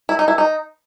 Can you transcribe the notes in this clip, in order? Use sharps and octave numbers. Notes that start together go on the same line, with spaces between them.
E4
D#4
E4
D#4